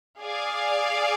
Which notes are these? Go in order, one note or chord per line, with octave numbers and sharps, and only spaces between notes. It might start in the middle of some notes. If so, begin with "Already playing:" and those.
G#4 D5 F5